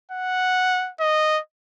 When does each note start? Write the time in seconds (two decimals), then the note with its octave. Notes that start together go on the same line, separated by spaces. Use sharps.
0.11 F#5
1.00 D#5